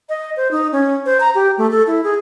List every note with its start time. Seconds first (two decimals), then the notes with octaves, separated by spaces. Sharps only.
0.09 D#5
0.37 C5
0.51 D#4
0.72 C#4
1.06 C5
1.20 A#5
1.35 G4
1.58 A3
1.71 A4
1.87 E4
2.04 G#4